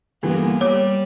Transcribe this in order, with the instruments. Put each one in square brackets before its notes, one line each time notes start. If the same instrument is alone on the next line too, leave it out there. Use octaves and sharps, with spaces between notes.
[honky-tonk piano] G2 D3 E3 [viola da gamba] A#3 B3
[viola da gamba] G3 [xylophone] C#5 [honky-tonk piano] D6